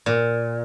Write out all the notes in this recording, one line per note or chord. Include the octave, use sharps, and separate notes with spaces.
A#2